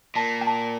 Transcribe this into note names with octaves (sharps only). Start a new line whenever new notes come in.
A#2 A5
G5
A5